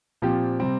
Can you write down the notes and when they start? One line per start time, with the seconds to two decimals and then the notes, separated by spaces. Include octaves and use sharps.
0.22 A#2 F3 C4 G4
0.60 C3 G3 C4